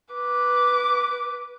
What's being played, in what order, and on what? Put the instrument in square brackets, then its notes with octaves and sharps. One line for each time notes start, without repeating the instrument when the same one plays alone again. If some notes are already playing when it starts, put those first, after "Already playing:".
[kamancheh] B4 D6